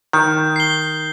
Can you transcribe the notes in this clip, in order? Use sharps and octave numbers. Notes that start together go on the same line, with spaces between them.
D#3 G6
C7 G7